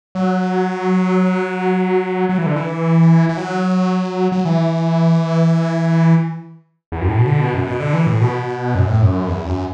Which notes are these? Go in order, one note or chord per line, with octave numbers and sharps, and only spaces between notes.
F#3
F#3
E3
D3
E3
E3
F#3
F#3
E3
E2
F#2
A2
B2
D3
B2
F#2
B2
D3
E3
A2
B2
F#2
A2
F#2
E2
F#2